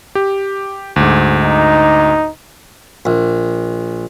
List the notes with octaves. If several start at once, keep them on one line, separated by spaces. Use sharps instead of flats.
G4
D2 G#2
D#4
A#1